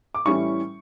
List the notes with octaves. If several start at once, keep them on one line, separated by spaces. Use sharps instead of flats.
D6
A2 E3 G3 C#4 E4 C#6